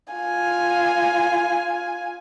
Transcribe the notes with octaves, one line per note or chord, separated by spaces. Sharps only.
F4 G#5